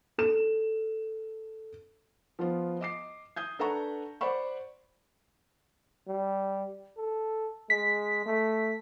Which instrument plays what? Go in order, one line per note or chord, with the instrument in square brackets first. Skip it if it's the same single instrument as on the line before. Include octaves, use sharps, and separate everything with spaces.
[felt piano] A4 E7
F3 B3 F4
D#5 D6 C7
D#6 G6 G#6
D4 A4 B4 F#5 A#5 C#6
C5 D5 F#5 B5 C#6
[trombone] G3
A4
[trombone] G#3 [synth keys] B6
[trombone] A3